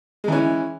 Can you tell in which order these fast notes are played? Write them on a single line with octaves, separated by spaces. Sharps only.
G#3 E3 C#4